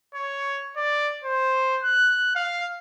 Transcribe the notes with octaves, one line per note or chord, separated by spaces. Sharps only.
C#5
D5
C5
F#6
F5